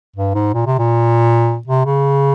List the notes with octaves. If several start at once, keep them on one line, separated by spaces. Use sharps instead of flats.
G2
G#2
A#2
C3
A#2
C3
C#3